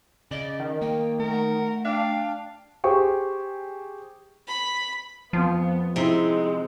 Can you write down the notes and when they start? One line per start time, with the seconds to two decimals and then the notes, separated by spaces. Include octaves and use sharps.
0.31 C#3 D5 D#5
0.59 D#3
0.81 A#3 G5
1.19 A3 A#4
1.31 F#5
1.85 D4 F5 G5
2.84 G4 G#4 C5 G5 C#6
4.48 B5
5.33 F2 F3 B3
5.96 C3 G#3 C4 D#4 E4